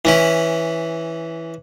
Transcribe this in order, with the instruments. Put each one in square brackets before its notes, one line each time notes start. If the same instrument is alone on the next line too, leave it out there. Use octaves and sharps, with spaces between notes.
[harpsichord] E3 C#4 E4